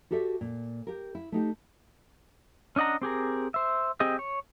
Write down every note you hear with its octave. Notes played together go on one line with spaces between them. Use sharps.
F#4 G4 A4 D5 E5
A#2
G4 A#4
E4
A3 D#4 G4
C#4 D4 D#5 F#5 A#5
C4 G4 G#4 A#4
C5 E5
C4 G4 G#4 D#5
C#5